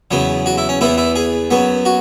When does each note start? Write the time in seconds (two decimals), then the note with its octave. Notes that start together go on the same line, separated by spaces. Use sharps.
0.11 E2 C#3 F#3 B3
0.46 F#4
0.57 E4
0.69 C#4
0.81 E2 E3 B3 E4
0.98 E4
1.16 G#4
1.51 F#2 F#3 B3
1.85 F#4